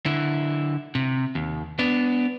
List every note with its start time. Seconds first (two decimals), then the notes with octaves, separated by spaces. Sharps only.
0.06 D3 E4
0.95 C3
1.35 D#2
1.79 B3 D4